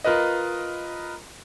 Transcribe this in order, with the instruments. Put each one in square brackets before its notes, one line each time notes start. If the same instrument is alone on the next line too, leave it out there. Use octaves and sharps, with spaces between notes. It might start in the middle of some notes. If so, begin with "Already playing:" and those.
[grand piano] F4 A#4 B4 D#5